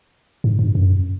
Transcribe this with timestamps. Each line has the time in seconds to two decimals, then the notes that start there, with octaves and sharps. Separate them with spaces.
0.44 G#2
0.59 G2
0.75 F#2